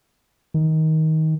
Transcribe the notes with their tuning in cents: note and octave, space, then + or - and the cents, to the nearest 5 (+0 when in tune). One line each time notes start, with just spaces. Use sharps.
D#3 +20